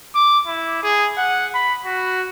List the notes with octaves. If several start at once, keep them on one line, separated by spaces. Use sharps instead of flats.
D6
E4
G#4
F#5
B5
F#4